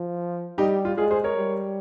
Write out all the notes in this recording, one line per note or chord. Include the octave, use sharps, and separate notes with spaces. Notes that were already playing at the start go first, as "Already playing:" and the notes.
Already playing: F3
G3 D#4 G4
F4
G#3 F4 G#4
G#4 C5
A#4 C#5
G3